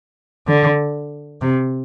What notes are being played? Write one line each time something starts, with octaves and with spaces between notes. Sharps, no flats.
D3
C3